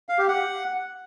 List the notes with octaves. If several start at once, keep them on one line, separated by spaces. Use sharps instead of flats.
F5
G4
F#5